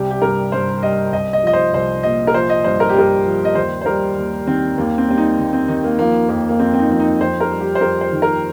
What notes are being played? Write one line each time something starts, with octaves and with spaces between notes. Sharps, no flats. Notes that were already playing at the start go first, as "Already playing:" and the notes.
Already playing: C2 C3 G3 G4
G4
G2 A#4
G2 C5
G3 D#5
C2 D#5
D#5
F3 D#5
C5
C2 C5
A#2 D#5
A#4
F3 C5
D#5
G2 C5
A#4
G4
G2 A#4
F3
D#5
D#2 C5
C5
G3 A#4
D#2
D#3 C4
D#2 A#3
C4
G3 C4
D#4
D#2
C4
D#3 D#4
A#3
F3 A#3
F2 A#3
A#3
F2 C4
C4
D#4
F3 C4
D#4
F2 C5
A#4
G3
G4
C5
F2 A#4
C5
D#3
A#4